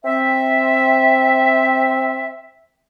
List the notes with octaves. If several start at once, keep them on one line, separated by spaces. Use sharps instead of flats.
C4 E5